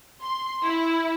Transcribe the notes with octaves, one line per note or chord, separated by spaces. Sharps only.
C6
E4